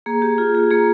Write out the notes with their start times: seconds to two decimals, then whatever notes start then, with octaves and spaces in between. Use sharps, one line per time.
0.06 A#3 G#4
0.22 G4
0.38 F4 G#4
0.55 G#4
0.71 A#3 G#4